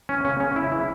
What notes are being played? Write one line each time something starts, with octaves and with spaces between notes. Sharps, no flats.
E3 C#4
C#3 C#4
C#3 C#4
C#3 E4
E3 E4